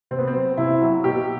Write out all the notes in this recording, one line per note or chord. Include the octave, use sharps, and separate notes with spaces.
C3 C4
B3
C4
F#3
C3 E4
F#3
B2 G4